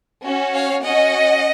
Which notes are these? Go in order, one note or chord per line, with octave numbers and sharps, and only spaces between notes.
C#4 F#4
C#5 F5
C#4 F#4 D#5 F#5